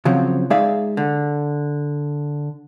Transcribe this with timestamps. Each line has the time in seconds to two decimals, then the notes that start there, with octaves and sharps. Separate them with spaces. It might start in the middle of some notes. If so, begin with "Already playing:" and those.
0.05 C#3 F3 F#3 C4
0.50 G#3 D#4 G#4 D5 E5 F5
0.97 D3